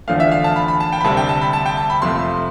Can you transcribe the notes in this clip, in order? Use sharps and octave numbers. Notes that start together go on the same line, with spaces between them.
E2 D3 F3 A3 F5
E5
F5
A5
B5
B5
A5
G5
B5
D2 C3 G3 A5
G5
A5
B5
A5
G5
A5
B5
F2 C3 F3 A3 C6